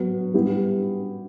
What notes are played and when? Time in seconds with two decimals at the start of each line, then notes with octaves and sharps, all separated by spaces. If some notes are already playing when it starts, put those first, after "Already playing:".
Already playing: F#3 B3 F#4
0.34 G3 B3 E4 G4